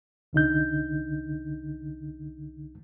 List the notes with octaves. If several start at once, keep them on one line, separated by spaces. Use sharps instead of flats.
C2 D3 D#4 G6